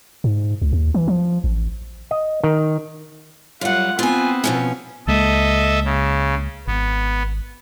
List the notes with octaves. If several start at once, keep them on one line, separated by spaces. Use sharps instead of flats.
G#2
C#2
D#2
E3
F3
A1
D#5
D#3
F#2 G3 F4 F#5
B3 C4 F4 G#5
B2 F3 C#4
C#2 G#3 A#3 A4 D#5 E5
C#3
G#1 B3